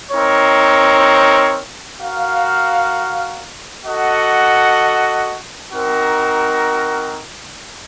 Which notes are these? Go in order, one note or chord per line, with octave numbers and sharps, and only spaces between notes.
C4 D#4 A#4 C#5
F#4 A#4 F5
F#4 A4 D#5 F#5
C4 D#4 F#4 A#4